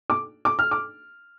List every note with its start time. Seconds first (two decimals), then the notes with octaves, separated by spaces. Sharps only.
0.10 D6
0.45 D6
0.59 F6
0.71 D6